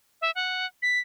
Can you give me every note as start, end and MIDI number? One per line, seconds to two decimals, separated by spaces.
0.21 0.31 76
0.35 0.66 78
0.82 0.99 95